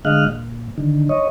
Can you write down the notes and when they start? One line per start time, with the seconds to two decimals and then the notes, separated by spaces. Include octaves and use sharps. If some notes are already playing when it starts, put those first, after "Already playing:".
0.05 D3 G#3 D#5 F5 F6 F#6
0.27 A#2
0.78 D3 D#3
1.09 C#5 D#5